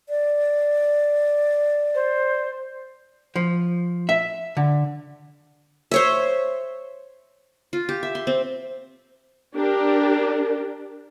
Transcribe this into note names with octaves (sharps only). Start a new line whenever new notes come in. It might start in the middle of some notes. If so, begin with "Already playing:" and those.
D5
C5
F3
E5
D3
C5 C#5 E5
F4
G4
E5
C6
C4
D4 G4 A#4